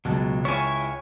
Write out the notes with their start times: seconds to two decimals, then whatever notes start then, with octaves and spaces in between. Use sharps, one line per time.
0.05 C#2 B2 F#3 A5
0.45 E4 F4 C#5 G#5